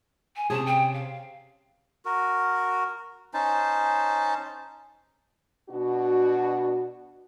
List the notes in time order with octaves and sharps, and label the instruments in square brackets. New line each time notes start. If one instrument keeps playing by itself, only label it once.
[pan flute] G#5
[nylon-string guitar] C3 C#4 G#4 [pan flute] A5
[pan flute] G5
F5
[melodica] F#4 A#4
C#4 D#4 C5 A5
[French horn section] B2 D4 F#4